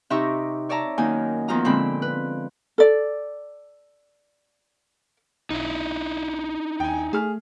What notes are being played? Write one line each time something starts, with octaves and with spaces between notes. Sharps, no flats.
C3 D#4 E5 A#5 C#6 D6
C#5 D5 E5 A5 A#5
F#2 D#3 A#3 D#4 G#5
E2 F3 F4 A#5 D#6
A#2 D3 G#3 C4 B5
B4
A4 D5
B1 D#4 E4
D#2 G5 G#5
A3 G#4 F6